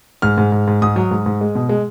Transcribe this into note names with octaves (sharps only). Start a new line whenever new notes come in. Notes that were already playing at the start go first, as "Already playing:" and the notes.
G#2 F6
G#2
G#2
G#2
G#2 D#6
F#3
G#2
G#2
G#3
B2
G#3